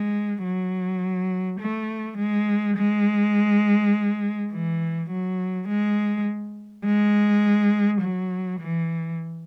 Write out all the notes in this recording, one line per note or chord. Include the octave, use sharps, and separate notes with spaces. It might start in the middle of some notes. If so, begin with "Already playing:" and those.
Already playing: G#3
F#3
A3
G#3
G#3
E3
F#3
G#3
G#3
F#3
E3